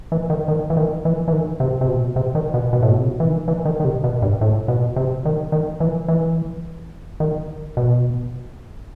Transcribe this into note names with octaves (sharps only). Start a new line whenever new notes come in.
E3
D#3
D#3
E3
D#3
E3
E3
D#3
C3
C3
B2
C3
D#3
B2
B2
A2
B2
C3
E3
D#3
E3
D#3
D#3
C3
B2
G2
A2
B2
C3
D#3
D#3
E3
E3
D#3
B2